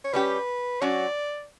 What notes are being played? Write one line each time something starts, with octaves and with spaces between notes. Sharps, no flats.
C#5
G3 C#4 G4 B4
F#3 C#4 F#4 D5